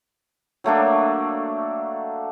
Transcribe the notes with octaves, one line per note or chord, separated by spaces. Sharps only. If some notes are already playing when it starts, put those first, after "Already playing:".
F#3 A3 A#3 D4